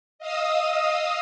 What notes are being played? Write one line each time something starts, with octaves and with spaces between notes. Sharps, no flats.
D#5 F5 D#6 E6